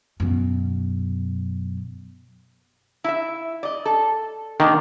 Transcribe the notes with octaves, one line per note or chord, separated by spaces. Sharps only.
F#2 B2
E4 E5
D5 D#5
A4
D#3 A#3 D4 A#4